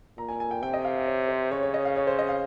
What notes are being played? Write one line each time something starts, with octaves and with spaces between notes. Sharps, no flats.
A#2 A#5
G#5
G#5
G5
C3 G5
D#5
F5
C#5
C5
C#3 C#5
C#5
D#5
F5
C#5
C5
D#5
F5